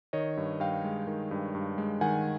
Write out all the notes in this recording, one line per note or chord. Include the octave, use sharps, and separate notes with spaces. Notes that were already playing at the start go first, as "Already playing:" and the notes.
D#3 C#5 D#5
G2
G2 F5 G5
G#3
D#3
G2
G2
G#3
D#3 F#5 G#5